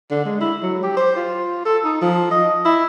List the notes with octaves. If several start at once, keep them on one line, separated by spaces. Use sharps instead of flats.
D3
G#3
E4
F#3
G4
C5
F4
A4
D#4
F3
D#5
E4